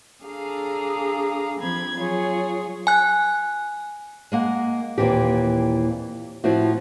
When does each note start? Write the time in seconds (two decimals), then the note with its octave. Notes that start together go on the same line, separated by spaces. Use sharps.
0.23 D4 G#4 A4 F5 A#5
1.60 F3 C4 B5 G#6
1.96 F#3 F4 G#4 C#5
2.87 G#5 F#6
4.32 G#3 A#3 F#5
4.98 D#2 A#2 E3 C4 G4
6.44 A2 F3 C4 E4 F#4